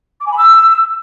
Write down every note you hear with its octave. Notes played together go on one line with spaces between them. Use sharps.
D6
G#5
B5
E6